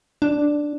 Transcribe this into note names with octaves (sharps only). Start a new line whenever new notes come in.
D4